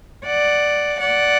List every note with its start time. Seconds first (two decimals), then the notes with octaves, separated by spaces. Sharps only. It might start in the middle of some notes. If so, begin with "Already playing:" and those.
0.25 D5 F#5
0.99 D5 F#5